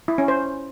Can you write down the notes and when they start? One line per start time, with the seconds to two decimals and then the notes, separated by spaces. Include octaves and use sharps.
0.08 E4
0.18 C#4
0.28 C5